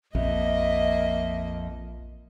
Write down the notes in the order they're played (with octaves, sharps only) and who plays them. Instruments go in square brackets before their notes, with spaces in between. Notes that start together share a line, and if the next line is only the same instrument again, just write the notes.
[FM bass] A#1 [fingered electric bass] F2 [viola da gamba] A#3 D#5 [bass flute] E5